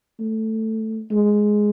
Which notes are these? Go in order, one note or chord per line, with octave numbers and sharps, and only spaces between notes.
A3
G#3